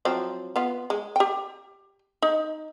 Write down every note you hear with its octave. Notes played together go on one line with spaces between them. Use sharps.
F3 F#3 C4
B3 F4
G#3
G4 G5
D#4